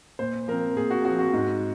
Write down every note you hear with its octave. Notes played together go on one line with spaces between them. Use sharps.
A#2 C5
F3 C4 A#4
A#2 G#4
F#4
F3 C4 F#4
F#4
G#2